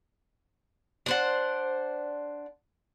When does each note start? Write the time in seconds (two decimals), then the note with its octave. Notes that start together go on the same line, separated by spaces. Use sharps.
1.06 D4 C5 F#5